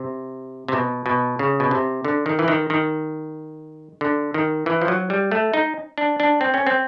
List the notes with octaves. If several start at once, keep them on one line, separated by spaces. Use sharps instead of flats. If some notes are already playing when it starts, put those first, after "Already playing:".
Already playing: C3
C3
B2
B2
C#3
B2
C3
D3
D#3
E3
D#3
D#3
D3
D#3
E3
F3
F#3
G3
A3
D#4
D4
D4
C4
C#4
C4